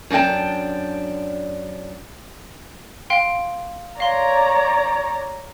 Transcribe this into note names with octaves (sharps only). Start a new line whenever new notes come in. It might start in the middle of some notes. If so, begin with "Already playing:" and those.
F#2 D4 D#4 G5 A5
F5 G5 C6
C#5 D5 F5 A#5 C6